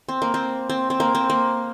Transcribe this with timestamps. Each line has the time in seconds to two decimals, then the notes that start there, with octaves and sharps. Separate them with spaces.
0.08 C4
0.22 A#3
0.34 C4
0.70 C4
0.90 C4
1.00 A#3
1.15 C4
1.30 A#3